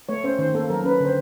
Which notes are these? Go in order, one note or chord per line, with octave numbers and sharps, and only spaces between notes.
A3 C#5
C#4 C5
D#3 C5
A#3 A4
F#3 A#4
C#4 B4
D3 C5